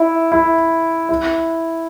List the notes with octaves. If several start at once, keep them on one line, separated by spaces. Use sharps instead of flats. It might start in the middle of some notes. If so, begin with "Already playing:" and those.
Already playing: E4
E4
E4